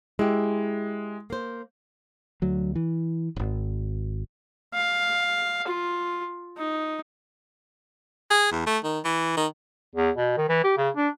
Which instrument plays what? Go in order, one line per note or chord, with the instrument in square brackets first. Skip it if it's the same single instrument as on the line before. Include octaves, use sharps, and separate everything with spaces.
[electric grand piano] G#3 [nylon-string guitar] E4 G4
[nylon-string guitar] A#3 C5
[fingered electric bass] D2 F#3
E3
D#1 G#1
[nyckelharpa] F5
F4
D#4
[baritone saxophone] G#4
E2
A3
D#3
E3
D#3
[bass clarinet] E2
B2
D#3
E3
G4
C#3
D4